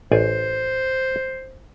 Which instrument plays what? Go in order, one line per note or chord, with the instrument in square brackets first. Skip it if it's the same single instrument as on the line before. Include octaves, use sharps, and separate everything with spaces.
[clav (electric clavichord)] A1 D5 G#5 [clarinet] C5